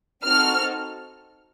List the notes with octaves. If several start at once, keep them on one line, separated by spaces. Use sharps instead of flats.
C4 D#4 F#4 A4 F6